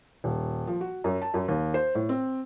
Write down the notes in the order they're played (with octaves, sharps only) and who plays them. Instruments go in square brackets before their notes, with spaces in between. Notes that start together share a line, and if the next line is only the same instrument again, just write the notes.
[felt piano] D#1
F3
F#4
F#2
A5
F#2
D#2
C5
A2
C4